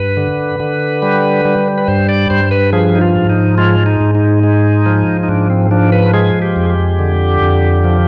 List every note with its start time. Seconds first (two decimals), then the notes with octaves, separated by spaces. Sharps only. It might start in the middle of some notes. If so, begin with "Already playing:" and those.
Already playing: G2 B4
0.17 D3
0.60 D3
1.02 G3
1.45 G3
1.78 B4
1.88 G2 C5
2.09 D5
2.30 G2 C5
2.51 B4
2.73 F3 G#4
2.95 D#4
3.01 F4
3.15 G#2
3.29 D#4
3.58 G#3 F4
3.86 D#4
4.00 G#2
4.15 D#4
4.43 G#3
4.86 F3
5.23 D#4
5.28 G#2 D4
5.50 C4
5.71 F3 D4
5.92 B4
6.14 G#3 G#4
6.42 G4
6.56 F2
6.63 G#4
6.70 G4
6.99 D3
7.41 F2
7.84 F3